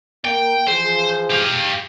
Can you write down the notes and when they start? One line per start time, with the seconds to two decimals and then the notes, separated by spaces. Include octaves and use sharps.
0.25 A#3 G5
0.68 E3 F3 G#4 C5
1.31 G4 F5